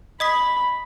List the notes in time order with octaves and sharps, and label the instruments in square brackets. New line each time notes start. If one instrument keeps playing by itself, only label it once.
[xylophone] D#5 D#6 B6 [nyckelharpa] B5